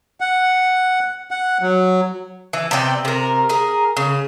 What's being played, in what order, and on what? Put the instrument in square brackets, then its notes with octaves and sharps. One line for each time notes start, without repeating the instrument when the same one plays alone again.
[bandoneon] F#5
F#5
F#3
[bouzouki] E3
C3 B3 D5 G5
C3 A#4
G#4 A#4
C#3